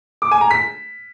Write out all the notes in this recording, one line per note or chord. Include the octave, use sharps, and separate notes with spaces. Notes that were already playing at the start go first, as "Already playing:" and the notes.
D6
G#5
A#5
B6